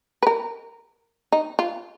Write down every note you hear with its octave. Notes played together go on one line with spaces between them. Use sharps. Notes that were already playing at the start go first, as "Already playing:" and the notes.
B4
A#4
D#4
F4